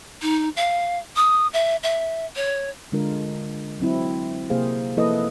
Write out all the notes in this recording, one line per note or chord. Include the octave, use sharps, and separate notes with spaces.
D#4
F5
D#6
E5
E5
C#5
D3 G#3 D4 F4 A#4
F#3 C4 E4
C3 A#3 G4 G#4 C5 F5
F3 A#3 E4 A4 B4 D#5